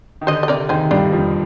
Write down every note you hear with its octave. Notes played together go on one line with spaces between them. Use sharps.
D#3
D3 C5 D#5
D#5
C3 A#4 D5
D#2 D#3 G#4 C5
G2 G3 D4 F4
F2 F3